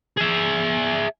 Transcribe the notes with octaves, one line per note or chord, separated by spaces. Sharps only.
G#4 E5